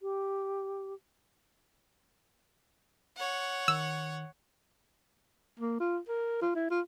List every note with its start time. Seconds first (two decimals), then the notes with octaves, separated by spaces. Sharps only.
0.02 G4
3.17 C#5 F#5
3.68 D#3 E6
5.59 A#3
5.80 F4
6.08 A#4
6.42 F4
6.55 E4
6.70 F4